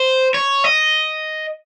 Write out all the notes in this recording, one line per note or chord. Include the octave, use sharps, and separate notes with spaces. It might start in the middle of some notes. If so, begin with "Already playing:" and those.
Already playing: C5
C#5
D#5